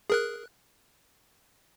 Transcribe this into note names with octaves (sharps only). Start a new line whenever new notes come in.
G#4 A#4 F#6